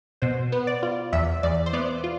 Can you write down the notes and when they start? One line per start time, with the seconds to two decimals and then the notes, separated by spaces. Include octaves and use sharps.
0.22 B2 C5
0.52 B3
0.67 D5
0.83 F4
1.13 E2 E5
1.43 E2 D5
1.66 C5
1.73 B3 D5
2.04 F4